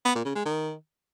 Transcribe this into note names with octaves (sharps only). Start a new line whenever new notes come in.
B3
A#2
C#3
G#3
D#3